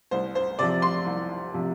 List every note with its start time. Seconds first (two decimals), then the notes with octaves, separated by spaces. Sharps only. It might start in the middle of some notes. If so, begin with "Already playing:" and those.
0.11 C2 C5
0.35 C5
0.59 C3 F3 D5
0.82 C6
1.06 C2
1.54 C3 F3